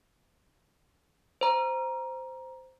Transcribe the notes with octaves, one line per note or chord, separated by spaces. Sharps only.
C5 A#5